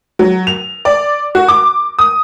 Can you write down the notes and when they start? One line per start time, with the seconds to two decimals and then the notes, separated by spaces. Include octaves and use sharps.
0.19 F#3
0.47 F7
0.85 D5
1.35 F#4
1.48 D6
1.99 D#6